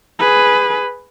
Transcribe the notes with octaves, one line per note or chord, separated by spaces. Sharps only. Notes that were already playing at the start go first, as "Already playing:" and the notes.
G#4 B4